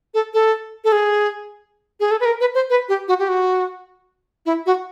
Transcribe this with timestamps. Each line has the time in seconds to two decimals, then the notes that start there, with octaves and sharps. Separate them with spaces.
0.14 A4
0.34 A4
0.84 A4
0.92 G#4
2.00 G#4
2.11 A4
2.20 B4
2.25 A#4
2.41 B4
2.55 C5
2.70 B4
2.89 G4
3.08 F#4
3.19 G4
3.29 F#4
4.46 E4
4.66 F#4